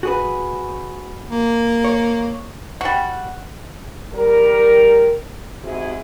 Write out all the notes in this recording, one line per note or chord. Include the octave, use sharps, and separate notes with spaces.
F#4 G#4 B4
A#3
C#5
G3 F#4
G3 A#4
G#2 C3 E4 F#4 G#4